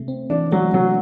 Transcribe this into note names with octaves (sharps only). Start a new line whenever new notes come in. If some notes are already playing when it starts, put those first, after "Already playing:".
Already playing: C3 A3
C4
E3 D4
F#3 A3
C3 F#3